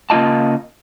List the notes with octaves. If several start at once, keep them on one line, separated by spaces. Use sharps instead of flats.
C#3 A#3 D4 F4 D#5 A5